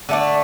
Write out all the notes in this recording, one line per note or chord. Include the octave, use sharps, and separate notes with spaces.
D3 A3 D4